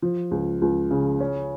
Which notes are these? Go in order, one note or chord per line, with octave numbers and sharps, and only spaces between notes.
F3
C#2
C#2
C#3
C#4